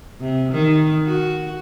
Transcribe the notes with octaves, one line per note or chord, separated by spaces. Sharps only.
C3
D#3
F#4